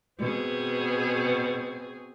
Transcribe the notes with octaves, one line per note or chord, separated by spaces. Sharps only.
B2 C4 G#4